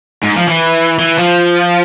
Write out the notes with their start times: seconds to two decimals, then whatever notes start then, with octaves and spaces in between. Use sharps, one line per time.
0.23 G#2
0.36 F3
0.48 E3
1.00 E3
1.19 F3